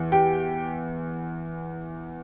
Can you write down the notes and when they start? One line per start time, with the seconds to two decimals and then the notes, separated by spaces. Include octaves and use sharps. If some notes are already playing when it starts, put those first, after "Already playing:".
Already playing: E2 E3
0.12 G4 G5